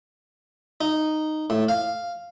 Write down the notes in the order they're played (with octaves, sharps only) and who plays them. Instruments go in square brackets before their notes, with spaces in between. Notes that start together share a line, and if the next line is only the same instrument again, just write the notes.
[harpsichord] D#4
A2
F5